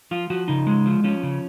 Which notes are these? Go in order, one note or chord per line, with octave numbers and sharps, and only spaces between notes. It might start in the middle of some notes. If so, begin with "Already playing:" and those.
F3 F4
F3 F#4
C#3 D#4
G#3
F3
F3 C#4
C#3